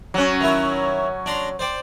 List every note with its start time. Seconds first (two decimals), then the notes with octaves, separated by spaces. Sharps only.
0.14 F#3 C#4
0.41 D#3 E4 A#5
1.26 D4 A#5 C6
1.59 C5 D5 G5